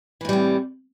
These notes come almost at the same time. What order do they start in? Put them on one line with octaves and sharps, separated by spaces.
E3 A2 G3 C3